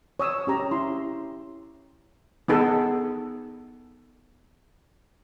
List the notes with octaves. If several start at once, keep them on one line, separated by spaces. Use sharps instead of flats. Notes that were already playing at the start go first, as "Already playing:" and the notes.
C#5 D#6 E6
C#4 G4 A#5
E4 C6
B3 D#4 G#4 A4